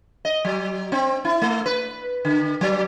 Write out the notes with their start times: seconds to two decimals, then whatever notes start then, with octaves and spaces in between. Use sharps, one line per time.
0.25 D#5
0.45 F#3
0.92 C4
1.25 E4
1.42 A3
1.66 B4
2.25 D3
2.61 F#3